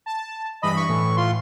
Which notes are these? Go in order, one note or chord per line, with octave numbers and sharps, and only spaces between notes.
A5
G2 E3 D#5 B5
C#6
A2 E3
F4 C6